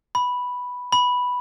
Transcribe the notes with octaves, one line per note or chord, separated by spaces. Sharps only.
B5
B5